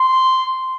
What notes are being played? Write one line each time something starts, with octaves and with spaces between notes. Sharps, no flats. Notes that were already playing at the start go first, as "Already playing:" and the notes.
Already playing: C6